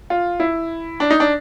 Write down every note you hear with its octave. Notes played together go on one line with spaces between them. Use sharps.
F4
E4
D4
D#4
D4